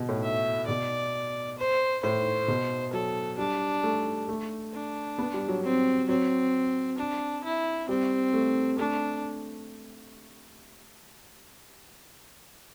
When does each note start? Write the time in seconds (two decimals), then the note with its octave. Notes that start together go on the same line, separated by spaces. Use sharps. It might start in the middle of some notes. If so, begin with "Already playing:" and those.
Already playing: B2
0.09 A2
0.24 E5
0.68 B2 D5
1.58 C5
2.03 A2 C5
2.48 B2
2.93 F#3 A4
3.38 G3 D4
3.83 A3
4.29 A3
4.73 D4
5.18 B3
5.34 G3
5.48 F#3
5.63 C4
6.08 F#3 C4
6.98 D4
7.44 E4
7.88 G3 C4
8.33 A3
8.79 A3 D4